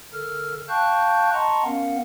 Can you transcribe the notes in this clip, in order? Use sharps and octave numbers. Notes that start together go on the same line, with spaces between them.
D3 A4 A#4 F6
F5 G5 A5 C#6 F#6 G6
D#5 F#5 A5 A#5 C6 C#6
B3 C#4 A#4 F5 F#5